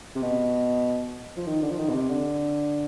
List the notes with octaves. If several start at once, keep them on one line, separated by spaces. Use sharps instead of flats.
C3
B2
F3
D#3
D3
F3
D#3
B2
C3
D3